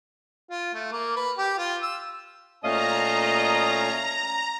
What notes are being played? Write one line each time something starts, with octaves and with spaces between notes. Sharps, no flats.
F4
A3
A#3
B4
G4
F4
E6
A#2 A3 C#4 D#5 F5 A5 A#5